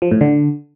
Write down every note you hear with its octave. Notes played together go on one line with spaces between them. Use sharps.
F3
A2
D3